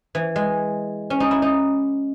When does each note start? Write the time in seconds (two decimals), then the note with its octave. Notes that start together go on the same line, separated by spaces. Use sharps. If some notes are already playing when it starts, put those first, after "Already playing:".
0.15 E3
0.36 G#3
1.10 C#4
1.20 D#4
1.31 E4
1.42 D#4